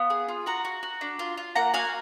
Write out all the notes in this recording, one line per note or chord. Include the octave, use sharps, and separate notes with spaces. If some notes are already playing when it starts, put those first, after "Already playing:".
Already playing: B3 F5
G#4
F4
F#4 F#5 A#5
F#4
F#4
D4
F4
F4
A#3 F#5 A#5
F#4 F5 G#5